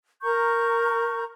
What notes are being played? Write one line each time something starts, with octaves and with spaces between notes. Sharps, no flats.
A#4 A#5 C#6 G6